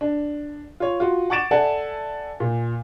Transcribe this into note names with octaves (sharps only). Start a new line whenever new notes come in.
D4
F4 C#5
F4 F#4
F#5 C#6 D6 A6 D7 E7
A4 D5 E5 F#5 G#5 A5
A#2